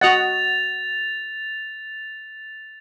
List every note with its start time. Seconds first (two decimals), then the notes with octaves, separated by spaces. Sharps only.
0.01 F#4 D#5 F#5 A6 F7